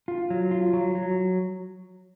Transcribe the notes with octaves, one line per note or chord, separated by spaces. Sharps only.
F4
F#3
F4
F#3
F#3